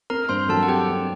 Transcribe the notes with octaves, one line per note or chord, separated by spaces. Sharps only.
C4 A#4 A#5
G2 C5 C6
F#3 A4 A5
F#5
C4 G4 G5
C4